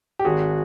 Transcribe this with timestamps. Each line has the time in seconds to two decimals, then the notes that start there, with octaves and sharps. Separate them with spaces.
0.19 G4
0.25 G#1 F#4 G#4